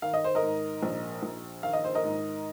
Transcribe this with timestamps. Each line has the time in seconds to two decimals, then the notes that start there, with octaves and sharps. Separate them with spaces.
0.02 D#3 F5
0.13 D#5
0.24 C5
0.35 A#4 D#5
0.42 G#2
0.83 A#1
1.23 A#1
1.63 D#3 F5
1.73 D#5
1.84 C5
1.95 A#4 D#5
2.03 G#2